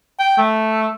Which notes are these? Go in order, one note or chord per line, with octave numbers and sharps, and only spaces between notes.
G5
A3